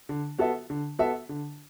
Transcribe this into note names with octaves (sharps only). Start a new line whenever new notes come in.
D3
B3 F#4 A4 E5
D3
B3 F#4 A4 E5
D3